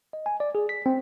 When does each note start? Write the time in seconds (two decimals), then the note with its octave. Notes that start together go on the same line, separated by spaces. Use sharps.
0.13 D#5
0.26 G#5
0.40 D5
0.55 G#4
0.69 B6
0.86 C4